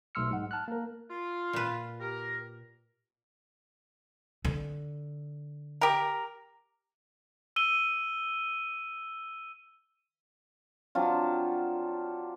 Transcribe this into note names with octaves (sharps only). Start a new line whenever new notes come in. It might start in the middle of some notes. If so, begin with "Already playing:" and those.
B1 A3 C6 E6 F6 C#7
G#2 F#5
A5 F6 F#6
A#3 A#4
F4
A#2 B4
G4 A#4
D3
G4 A#4
E6 D#7 G7
F#3 C4 D4 F4